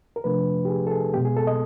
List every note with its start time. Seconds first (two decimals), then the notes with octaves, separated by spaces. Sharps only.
0.16 A#4
0.24 C3 F3 A3 D4 B4
0.65 G4
0.68 G#4
0.87 A4
0.91 G#4
1.14 B2 G#3 B3 G4
1.25 G#4
1.37 A4
1.47 D#5